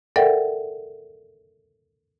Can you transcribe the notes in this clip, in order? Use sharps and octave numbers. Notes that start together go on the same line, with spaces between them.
A4 A#4 D5 E5 F#5 G5